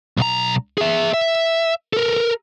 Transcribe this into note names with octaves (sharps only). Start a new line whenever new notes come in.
B1 A#5
G#4 E5
E5
A4 A#4